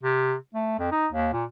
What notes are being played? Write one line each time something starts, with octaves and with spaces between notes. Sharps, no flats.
C3
A3
F2
D#4
D#2
A#2